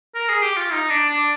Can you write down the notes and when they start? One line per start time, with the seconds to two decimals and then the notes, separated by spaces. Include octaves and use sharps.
0.15 A#4
0.29 G#4
0.42 G4
0.57 F4
0.72 D#4
0.90 D4
1.09 D4